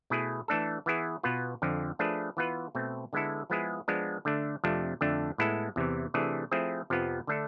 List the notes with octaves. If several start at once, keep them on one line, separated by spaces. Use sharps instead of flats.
B2 A3 E4 G#4 B4
E3 A3 D4 A4
E3 B3 E4 G#4
B2 B3 F4 B4
F2 D3 F3
F3 A3 D4 G#4 B4
E3 B3 F4 B4
B2 A3 C4
D3 G#3 B3 E4 A4
F3 G#3 B3 E4 G#4
F3 G#3 B3 D4
D3 A3 D4
F2 C3 F3 A3 D4
F2 D3 A3 D4
A2 G#3 B3 E4 A4
E2 C3 E3
C3 E3 A3 D4 G#4
F3 A3 C4 E4 G#4
F2 C3 F3 B3 F4
D3 A3 D4 A4